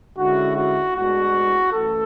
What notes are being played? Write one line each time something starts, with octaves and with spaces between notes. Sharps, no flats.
D3 G#3 C#4 E4 F#4
F#4
A2 G#3 B3 D4 F#4
F#2 E3 A3 A4